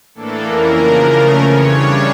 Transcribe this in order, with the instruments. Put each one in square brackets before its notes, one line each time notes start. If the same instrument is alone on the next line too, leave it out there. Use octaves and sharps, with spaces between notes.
[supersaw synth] A2 E3 A#3 D4 A4
F2 E3 A#3 C#4 A#4
C#3 F3 A#3 D4
C#3 F3 A3 C#4
F2 C#3 E3 C#5
C#3 G3 D4